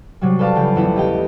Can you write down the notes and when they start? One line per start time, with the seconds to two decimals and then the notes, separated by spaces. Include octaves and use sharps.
0.21 C3 F#3 G3
0.39 A4 B4 D5 F5 A5
0.56 C#3 F3 G5 D7
0.76 E2 A3 B3 E4
0.96 G4 D#5 G5